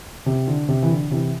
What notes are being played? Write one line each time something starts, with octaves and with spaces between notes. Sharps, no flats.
C3
D3
C3
E3
D3
C3 E3